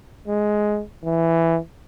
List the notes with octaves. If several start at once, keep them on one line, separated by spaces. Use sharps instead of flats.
G#3
E3